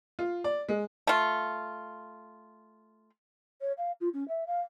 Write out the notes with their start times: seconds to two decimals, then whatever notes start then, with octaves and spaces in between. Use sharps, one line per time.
0.19 F4
0.44 D5
0.69 G#3
1.07 A3 F4
3.61 C#5
3.78 F5
4.01 F4
4.14 C#4
4.28 E5
4.47 F5